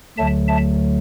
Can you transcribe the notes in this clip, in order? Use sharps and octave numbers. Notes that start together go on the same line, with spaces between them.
D2 D3 F#3 A3 E5 A5
E5 A5